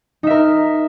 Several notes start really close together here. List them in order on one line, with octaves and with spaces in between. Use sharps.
D#4 E5 A#4